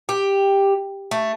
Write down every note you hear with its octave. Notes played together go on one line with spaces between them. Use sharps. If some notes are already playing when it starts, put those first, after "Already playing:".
G4
A3